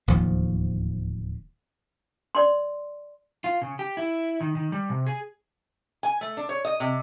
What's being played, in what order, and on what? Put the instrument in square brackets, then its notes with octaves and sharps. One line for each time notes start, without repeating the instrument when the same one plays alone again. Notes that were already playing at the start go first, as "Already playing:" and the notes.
[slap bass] D1 D#2 F3
[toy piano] D5 C6
[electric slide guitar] F4
C#3
G4
E4
D#3
D#3
G3
C3
G#4
[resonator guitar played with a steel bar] G#5
A3
D4
C#5
D#5
C3